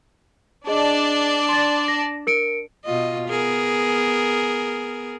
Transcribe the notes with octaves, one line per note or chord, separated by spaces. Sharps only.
D4 G#4 D5 D#5 A5
C6 A6
A#6
A#4 C#7 D7
B2 F4 D#5
B3 G#4 A#4